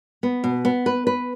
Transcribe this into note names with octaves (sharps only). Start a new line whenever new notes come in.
B3
B2
B3
B4
B4